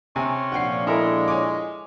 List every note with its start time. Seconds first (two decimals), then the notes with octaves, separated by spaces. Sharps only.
0.16 C3 C#4 G#5
0.52 A#2 F3 D4 F#5 G5 C7
0.87 G#3 E4 A4 A#4
1.28 C#5 G#5 D6